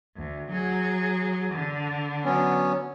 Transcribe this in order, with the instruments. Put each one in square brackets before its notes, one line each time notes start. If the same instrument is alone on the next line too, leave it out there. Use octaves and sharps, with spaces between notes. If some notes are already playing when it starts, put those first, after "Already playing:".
[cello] D2
F#3 G#4
D3
[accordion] F#3 B3 C#4